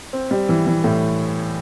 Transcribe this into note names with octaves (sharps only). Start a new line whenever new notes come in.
C4
G3
E3
E3
A2